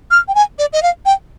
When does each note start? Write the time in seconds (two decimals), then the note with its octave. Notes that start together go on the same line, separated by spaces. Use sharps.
0.11 F6
0.28 G5
0.35 G#5
0.59 D5
0.73 D#5
0.83 F5
1.06 G5